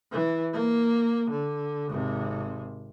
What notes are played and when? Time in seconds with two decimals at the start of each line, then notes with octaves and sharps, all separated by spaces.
0.11 E3
0.53 A#3
1.30 D3
1.89 G#1 C3